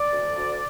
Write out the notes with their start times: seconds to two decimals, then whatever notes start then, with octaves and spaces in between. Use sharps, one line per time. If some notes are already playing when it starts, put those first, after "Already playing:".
Already playing: D5
0.11 D2
0.35 D2